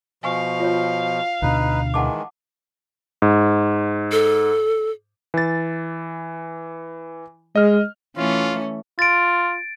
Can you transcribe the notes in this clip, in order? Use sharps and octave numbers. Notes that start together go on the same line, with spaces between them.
B2 F3 F5 G#5 C#6
F4 C#5
D2 B2 D4 D#4 B4
D#3 E3 G#3 F#5 A5 D6
G#2
A4
E3 A6
G#3 D#5 F6
E3 A3 C#4 F4
F4 A6 D7